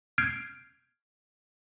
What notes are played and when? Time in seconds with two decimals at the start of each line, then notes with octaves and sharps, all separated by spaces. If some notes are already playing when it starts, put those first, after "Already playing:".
0.18 F6 G6 G#6 C7 D7